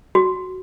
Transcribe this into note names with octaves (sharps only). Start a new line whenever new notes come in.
F#4